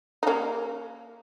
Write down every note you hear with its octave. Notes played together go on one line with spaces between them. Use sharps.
D#4
A#3 C#4